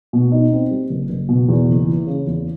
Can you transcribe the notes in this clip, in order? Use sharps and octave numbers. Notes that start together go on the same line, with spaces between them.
B2
D#4
C4
G3
F#1
F#1
B2
E2
F#1
E3
C#3
E2